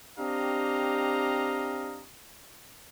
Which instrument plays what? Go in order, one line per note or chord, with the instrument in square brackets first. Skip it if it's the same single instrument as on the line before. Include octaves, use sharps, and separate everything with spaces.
[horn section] C4 D4 G4 D#5 F5 A#5